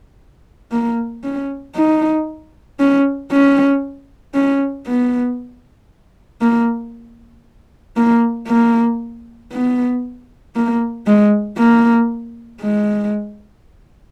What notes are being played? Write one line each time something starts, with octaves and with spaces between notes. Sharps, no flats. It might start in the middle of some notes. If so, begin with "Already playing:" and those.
A#3
C#4
D#4
C#4
C#4
C#4
B3
A#3
A#3
A#3
B3
A#3
G#3
A#3
G#3